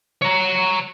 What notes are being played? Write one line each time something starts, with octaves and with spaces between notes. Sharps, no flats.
C#5 A#5